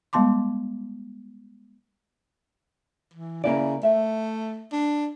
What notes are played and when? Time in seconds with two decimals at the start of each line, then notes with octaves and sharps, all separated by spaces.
0.13 G3 G#3 B3 A5 C6 D6
3.14 E3
3.44 C#3 A#3 E4 D5
3.83 A3 E5
4.72 D4